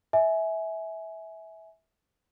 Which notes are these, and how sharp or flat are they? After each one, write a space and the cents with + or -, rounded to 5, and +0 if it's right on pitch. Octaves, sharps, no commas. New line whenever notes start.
E5 -20 G#5 +15